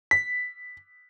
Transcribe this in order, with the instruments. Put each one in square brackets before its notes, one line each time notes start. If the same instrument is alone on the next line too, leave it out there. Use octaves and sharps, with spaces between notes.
[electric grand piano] B6